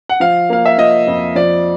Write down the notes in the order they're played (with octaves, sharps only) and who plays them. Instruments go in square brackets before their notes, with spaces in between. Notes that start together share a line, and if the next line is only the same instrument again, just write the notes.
[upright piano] F#5
F3 F5
A#3 F5
E5
F3 D#5
F2
F3 D5